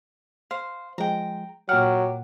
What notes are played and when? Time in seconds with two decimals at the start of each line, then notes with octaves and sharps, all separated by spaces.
0.51 C5 F5
0.98 F3 G#3 G5 A#5
1.69 A#2 F#3 G4 F#5 F6